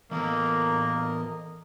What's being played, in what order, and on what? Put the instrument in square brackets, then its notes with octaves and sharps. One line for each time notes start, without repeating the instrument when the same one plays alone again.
[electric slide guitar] E3 B3 A4 [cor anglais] A#3 [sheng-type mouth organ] A#4 D#5